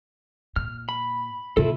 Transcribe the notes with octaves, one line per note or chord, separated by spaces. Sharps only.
A#2 F6
B5
B2 D3 E4 F4 A4